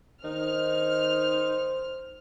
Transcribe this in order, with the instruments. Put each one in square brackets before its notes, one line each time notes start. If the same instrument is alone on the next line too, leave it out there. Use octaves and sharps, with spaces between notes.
[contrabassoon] D#3 [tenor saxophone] D#4 [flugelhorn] C5 [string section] F6